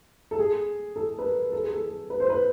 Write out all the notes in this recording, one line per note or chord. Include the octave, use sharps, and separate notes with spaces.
A4
G#4
A4
B4
A#4
A4
G#4
A4
B4
C5
B4